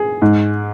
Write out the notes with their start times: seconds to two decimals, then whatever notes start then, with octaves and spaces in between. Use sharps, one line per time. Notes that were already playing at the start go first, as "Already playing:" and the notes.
Already playing: G#4
0.22 G#2